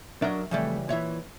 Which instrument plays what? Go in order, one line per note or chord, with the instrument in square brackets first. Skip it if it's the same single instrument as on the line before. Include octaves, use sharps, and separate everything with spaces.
[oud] F#3 A#4 E5 [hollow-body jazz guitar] D4 D#5
[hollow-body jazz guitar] F2 A3 [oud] C#3 E3 G3
[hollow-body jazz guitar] A#2 E3 [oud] C#5 E5